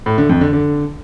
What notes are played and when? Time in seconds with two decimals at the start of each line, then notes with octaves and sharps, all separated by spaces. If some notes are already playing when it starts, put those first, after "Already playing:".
0.06 A2
0.18 D3
0.29 F2
0.41 D3
0.53 D3